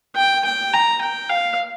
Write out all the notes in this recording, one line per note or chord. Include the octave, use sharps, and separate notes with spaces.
G5
G5
A#5
G5
F5